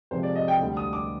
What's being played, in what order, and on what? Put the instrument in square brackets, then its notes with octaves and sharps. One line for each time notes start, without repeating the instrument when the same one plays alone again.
[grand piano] F2 C3 F3 G#3 C5
D5
D#5
G5
D2 D3 G3
D#6
D6